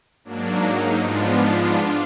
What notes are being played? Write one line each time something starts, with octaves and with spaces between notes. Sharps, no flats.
G#2 F#3 A#3 D4
D#4
G#2 F3 G#3 B3 D4 F4
D4 F4